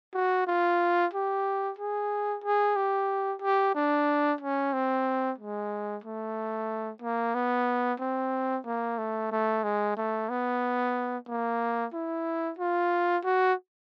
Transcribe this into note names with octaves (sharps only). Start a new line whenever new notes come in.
F#4
F4
G4
G#4
G#4
G4
G4
D4
C#4
C4
G#3
A3
A#3
B3
C4
A#3
A3
A3
G#3
A3
B3
A#3
E4
F4
F#4